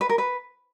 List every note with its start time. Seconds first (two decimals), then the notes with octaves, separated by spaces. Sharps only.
0.01 B4
0.09 A#4
0.18 B4